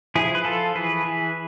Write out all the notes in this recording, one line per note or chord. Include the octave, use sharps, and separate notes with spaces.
F3 E4 G#4
B4
F3 F4 A4
E3 G#4 B4
E3